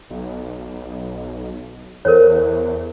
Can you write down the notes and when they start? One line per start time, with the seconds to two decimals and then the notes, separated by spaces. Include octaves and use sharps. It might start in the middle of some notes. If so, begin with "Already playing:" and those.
0.10 B1
2.05 E2 A#4 C5 C#5